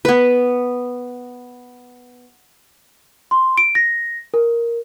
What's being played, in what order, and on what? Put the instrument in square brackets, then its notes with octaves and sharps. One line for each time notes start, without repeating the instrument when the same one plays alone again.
[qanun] B3 B4
[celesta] C6
D7
A#6
A#4